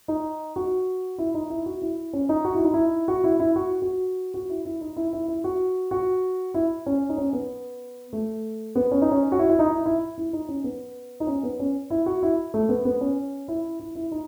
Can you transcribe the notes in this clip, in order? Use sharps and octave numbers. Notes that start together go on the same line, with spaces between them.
D#4
F#4
E4
D#4
E4
F#4
E4
C#4
D#4
F#4
E4
D#4
E4
F#4
E4
E4
F#4
F#4
F#4
E4
E4
D#4
E4
E4
E4
F#4
F#4
E4
C#4
D#4
C#4
B3
A3
B3
C#4
D#4
C#4
F#4
E4
E4
D#4
E4
E4
E4
D#4
C#4
B3
D#4
C#4
B3
C#4
E4
F#4
E4
A3
B3
B3
C#4
E4
E4
E4
D#4